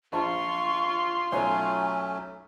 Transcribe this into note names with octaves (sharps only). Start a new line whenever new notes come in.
A#1 F4 A5 C6 C#6
B1 F#3 A3 C#4 C#5 G#5